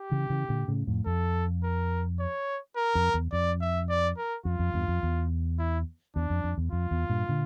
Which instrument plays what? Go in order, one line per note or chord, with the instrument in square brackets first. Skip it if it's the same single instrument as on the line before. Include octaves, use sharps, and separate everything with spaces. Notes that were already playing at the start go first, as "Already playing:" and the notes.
Already playing: [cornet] G4
[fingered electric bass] C#3 E3
C#3 E3
A#2 D3
A2 C#3
F2 A2
[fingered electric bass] F2 [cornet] A4
[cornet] A#4
C#5
A#4
[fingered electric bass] F2
E2
[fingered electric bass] F2 [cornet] D5
[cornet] E5
D5
A#4
[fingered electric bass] F2 [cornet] F4
[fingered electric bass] F2
E2 G2
F2
E2
[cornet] E4
[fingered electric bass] E2 [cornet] D4
[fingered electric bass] F2
F2
E2
[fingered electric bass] F2 [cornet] F4
[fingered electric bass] E2
G2 A#2
A#2 D3